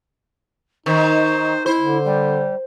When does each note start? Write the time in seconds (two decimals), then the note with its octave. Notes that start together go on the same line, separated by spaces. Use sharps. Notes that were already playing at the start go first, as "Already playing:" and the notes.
0.86 D#3 D#4 C5
1.66 E4 C5
1.78 D3
2.04 G3